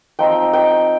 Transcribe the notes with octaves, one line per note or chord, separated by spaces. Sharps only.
F3 C4 D#4 G5
G5